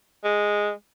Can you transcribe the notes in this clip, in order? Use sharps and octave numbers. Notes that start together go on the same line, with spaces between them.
G#3